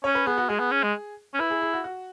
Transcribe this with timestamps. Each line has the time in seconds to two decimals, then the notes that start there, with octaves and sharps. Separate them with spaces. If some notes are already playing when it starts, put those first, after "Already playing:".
0.04 C#4 C#5
0.15 B4
0.27 B3 G#4
0.38 F#4
0.49 G#3 G#4
0.60 B3
0.71 C#4
0.83 G#3
1.34 C#4
1.39 E4 B4
1.50 G#4
1.62 G#4
1.73 F#4
1.84 F#4